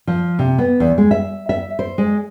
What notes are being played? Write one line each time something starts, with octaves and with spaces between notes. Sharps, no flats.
F3
C3
B3
E2
G#3
E5
E5
C5
G#3